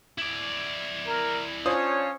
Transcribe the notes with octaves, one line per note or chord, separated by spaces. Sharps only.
E4 D5
A#4
C#4 D4 F4 C5 C#5 D#6